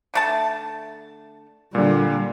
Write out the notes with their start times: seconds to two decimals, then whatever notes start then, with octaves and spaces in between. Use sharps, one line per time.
0.14 D3 A3 A5
1.75 A#2 D3 G3